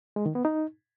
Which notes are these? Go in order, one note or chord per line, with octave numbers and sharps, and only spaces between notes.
G#3
D#3
B3
D#4